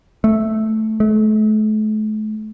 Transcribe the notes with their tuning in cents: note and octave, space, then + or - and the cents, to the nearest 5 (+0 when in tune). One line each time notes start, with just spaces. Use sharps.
A3 -5
A3 -40